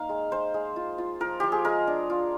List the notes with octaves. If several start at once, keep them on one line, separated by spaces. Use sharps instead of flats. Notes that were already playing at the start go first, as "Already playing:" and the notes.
Already playing: A#3 D#4 F5
G#3
G#3 C5
G#3
F4
F4
F3 A#4
F3 G4
G#4
G#3 A#4
D4
F4